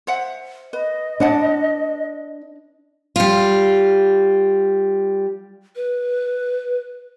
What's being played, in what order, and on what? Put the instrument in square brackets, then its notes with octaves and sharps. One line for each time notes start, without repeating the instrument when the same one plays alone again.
[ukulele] C5 E5 F#5
[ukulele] B4 [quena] D#5
[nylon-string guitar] D4 [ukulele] B4 F#5 A5
[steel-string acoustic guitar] G3 F4
[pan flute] B4